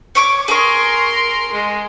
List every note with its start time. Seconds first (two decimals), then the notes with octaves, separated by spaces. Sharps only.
0.15 C#5 C#6 D6
0.48 G#4 A#4 C6 C#6
1.53 G#3